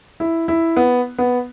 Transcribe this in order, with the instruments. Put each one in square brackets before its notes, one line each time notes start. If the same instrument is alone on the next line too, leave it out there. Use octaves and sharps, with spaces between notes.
[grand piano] E4
E4
B3
B3